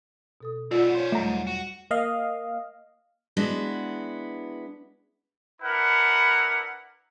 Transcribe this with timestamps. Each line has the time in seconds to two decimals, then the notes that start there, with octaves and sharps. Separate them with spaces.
0.41 B2 A4 D#6
0.71 G#2 B3 F4 D5
0.95 C#4 C5 C#5 F5 C6
1.12 E2 G#2 F#3 G3 A3 A#5
1.47 F#4
1.91 A#3 D#5 F5
3.37 G#3 B3 D4 E4 F#4
5.61 D4 E4 A#4 B4 F#5 B5